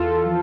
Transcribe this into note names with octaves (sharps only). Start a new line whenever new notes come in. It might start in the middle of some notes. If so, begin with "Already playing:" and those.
Already playing: E2 F4 A4
F3